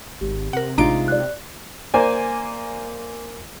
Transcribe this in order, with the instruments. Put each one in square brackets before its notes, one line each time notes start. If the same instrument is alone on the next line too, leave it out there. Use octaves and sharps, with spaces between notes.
[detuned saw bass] G#1 [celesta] G4
[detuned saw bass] C3 [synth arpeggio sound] A#4 F#5
[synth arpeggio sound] A1 D4 D7 [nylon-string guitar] G#3 D#4 F4 [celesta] A#5
[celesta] D5 F#6
[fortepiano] A#3 C5 D5 G#5